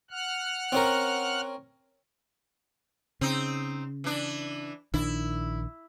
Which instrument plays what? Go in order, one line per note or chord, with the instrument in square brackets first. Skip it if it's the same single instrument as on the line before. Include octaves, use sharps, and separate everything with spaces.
[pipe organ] F#5 F6 F#6
[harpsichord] C4 C#4 A#4
[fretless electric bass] C#3 [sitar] C4 D#4
[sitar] E3 D4
[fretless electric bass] A#1 D#3 D4 [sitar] E4